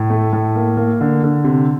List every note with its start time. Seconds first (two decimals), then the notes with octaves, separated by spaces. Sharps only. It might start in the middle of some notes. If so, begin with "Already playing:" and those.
Already playing: A2
0.10 A3
0.33 A2
0.56 A#3
0.77 A#3
1.01 D3
1.23 D3
1.44 C3